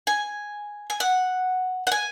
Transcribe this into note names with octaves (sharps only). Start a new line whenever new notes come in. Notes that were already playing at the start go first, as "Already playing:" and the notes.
G#5
G#5
F#5
F#5
G#5